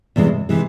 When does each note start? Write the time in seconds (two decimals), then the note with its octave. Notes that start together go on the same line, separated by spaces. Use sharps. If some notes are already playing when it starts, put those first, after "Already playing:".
0.16 E2 C3 E3 G#3
0.49 C3 E3 G#3